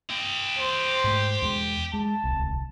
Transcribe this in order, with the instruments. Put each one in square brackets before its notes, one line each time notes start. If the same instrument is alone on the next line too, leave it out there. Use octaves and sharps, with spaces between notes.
[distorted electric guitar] G4 D#5
[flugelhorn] C5
[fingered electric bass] G#2 A3
E2 G#3
[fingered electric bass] G#3 [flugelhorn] A5
[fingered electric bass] D1 C2